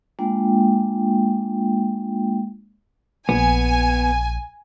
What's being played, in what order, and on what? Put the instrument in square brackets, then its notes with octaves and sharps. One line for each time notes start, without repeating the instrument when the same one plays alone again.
[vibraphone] G#3 A#3 D4 F4 G5
[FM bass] A#1 [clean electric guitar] B3 [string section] G#5